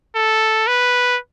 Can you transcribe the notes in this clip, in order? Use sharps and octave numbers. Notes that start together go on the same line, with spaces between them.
A4
B4